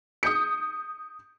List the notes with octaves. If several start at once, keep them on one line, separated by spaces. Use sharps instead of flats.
D#6 G6 C#7